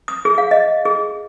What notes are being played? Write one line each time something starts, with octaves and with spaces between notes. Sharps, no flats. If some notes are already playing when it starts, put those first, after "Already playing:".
D#6
G#4
F5
D#5
G#4